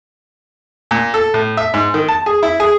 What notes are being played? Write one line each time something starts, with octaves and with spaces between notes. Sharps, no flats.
A#2
A4
A2
E5
G#2
D#3
A5
G#4
E4
G#4